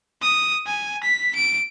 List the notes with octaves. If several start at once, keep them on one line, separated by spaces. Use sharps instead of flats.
D#6
G#5
B6
D7